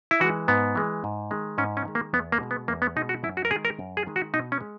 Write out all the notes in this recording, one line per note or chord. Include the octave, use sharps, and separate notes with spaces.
E4
E3 G#3 F#4
G#2 B3
E3 G#3
G#2
D#3 G#3
G#2 C#4
C#4
D#3 G#3
A#3
E2 B3
A#3
B2 G#3
B3
E2 A#3
B3
B2 G#3 D#4
F#4
F#2 E4
F#4
A#4
D#3 G#4
G#3
A#4
F#2
G#4
D#3 G#3
F#4
B2 D#4
C#4
G#3